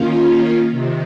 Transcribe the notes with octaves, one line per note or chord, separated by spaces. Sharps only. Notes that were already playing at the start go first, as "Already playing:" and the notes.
Already playing: D#3 A#3 C#4 F4
C3 D#3